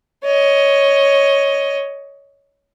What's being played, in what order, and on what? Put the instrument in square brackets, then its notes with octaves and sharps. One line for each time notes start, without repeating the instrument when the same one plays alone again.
[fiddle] C#5 D#5